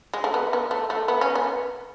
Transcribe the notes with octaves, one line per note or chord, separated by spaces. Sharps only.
G#3
A3
B3
B3
A3
A3
B3
C#4
B3